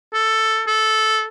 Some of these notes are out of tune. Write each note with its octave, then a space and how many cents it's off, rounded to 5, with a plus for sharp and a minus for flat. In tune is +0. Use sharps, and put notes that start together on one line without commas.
A4 +5
A4 -10